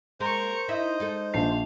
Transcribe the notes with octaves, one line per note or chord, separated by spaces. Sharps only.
G#3 A#3 G#4 A#4 C5 C#6
D#4 E4 D#5 E5
G#3 D#4 A4
A#1 F5 A5 C7